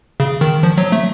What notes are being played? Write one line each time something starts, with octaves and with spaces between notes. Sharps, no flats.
C#3
D#3
F3
F#3
A3